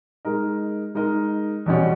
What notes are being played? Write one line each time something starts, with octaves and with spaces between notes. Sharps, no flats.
G#3 D#4 A#4 D#5
G#3 D#4 A#4 D#5
E2 B2 G3 C#4